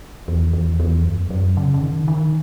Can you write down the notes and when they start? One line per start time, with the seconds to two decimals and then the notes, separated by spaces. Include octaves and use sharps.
0.28 E2
0.53 E2
0.80 E2
1.04 F#2
1.24 E2
1.30 F#2
1.57 C#3
1.74 C#3
1.83 D#3
2.08 D#3